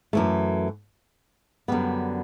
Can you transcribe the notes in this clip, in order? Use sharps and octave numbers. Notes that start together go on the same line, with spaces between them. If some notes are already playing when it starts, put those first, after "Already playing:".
F#2 E3 A3
F#2 D3 G3 B3